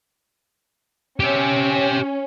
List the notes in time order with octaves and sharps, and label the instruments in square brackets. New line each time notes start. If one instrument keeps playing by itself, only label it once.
[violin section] C#4 [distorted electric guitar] G4 E5